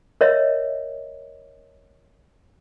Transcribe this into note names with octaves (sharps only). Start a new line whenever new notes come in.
A#4 C#5 D#5 E5